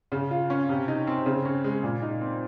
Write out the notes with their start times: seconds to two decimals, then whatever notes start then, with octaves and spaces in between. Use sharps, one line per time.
0.12 C#3
0.31 F4
0.50 C#4
0.69 C3
0.88 D#4
1.07 C4
1.26 C#3
1.45 C#4
1.64 G#3
1.83 A#2
2.02 D#4
2.21 C4